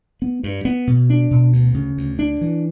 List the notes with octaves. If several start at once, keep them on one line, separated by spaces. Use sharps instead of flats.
B3
G2
B3
B2
D4
B2
D2
C#3
D2
D4
E3